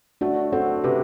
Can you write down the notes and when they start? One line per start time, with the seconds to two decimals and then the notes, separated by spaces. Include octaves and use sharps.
0.21 A3 D4 F#4
0.53 C4 F#4 A4
0.84 C3 G4 B4